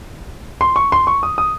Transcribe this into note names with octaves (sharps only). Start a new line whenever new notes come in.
C6
C#6
C6
C#6
D#6
D#6